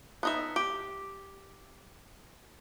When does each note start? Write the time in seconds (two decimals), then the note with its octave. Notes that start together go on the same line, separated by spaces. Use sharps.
0.23 B3 D#4 E5
0.56 G4